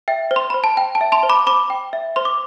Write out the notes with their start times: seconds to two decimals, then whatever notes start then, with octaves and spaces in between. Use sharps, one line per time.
0.08 E5 G5
0.31 C5
0.36 C6
0.50 C5 B5
0.64 A5
0.77 G5
0.95 A5
1.01 E5
1.12 A5 C6
1.23 C5
1.29 B5 D6
1.47 C5 B5 D6
1.70 G5
1.93 E5
2.16 C5 C6
2.25 D6